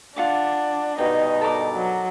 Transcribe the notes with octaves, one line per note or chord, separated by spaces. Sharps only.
D4 F4 F#5 D6
G2 B2 D#4 G5
A4 A#4 D5
F#3